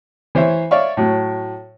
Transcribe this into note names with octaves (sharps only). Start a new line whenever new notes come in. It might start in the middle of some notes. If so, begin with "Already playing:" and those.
E3 C5 C#5 E5
C#5 D5 E5 F5 C#6
A2 F#3